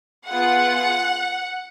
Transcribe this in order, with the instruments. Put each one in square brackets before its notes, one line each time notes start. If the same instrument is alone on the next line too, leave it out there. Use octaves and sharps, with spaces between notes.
[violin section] B3 F4 G#4 F#5